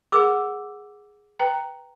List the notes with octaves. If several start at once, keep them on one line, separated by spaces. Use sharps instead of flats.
G#4 A#4 F#5 D6 E6
B4 G5 A#5